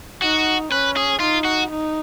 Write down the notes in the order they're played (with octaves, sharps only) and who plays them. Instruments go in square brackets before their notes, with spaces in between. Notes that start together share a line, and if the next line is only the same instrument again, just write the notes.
[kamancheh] D#4 [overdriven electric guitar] F#4
[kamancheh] C#4 [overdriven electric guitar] B4
[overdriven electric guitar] G#4
[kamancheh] D#4 [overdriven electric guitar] F4
[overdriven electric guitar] F#4
[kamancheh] D#4